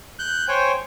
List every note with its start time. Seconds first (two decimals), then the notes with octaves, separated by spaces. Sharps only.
0.19 F#6 G6
0.48 C5 C#5 G5 G#5